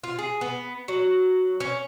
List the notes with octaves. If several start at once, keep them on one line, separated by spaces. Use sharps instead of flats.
F4
G#4
B3
F#3
C#4